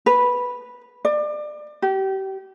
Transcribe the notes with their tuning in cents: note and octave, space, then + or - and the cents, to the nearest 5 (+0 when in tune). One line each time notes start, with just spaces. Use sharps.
B4 -5
D5 +30
G4 -30